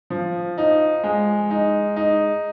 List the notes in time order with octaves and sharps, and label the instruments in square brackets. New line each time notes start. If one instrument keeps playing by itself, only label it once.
[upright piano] F3
D#4
G#3
D#4
D#4